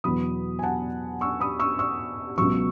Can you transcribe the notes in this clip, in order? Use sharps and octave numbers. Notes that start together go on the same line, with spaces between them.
E2 B2 F#3 B5 D#6
G#5
F#5 A5
C#6 E6
B5 D#6
C#6 E6
C#6 E6
C#2 B2 F#3 C#6 E6